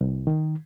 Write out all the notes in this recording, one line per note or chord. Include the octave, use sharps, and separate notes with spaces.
C2
D#3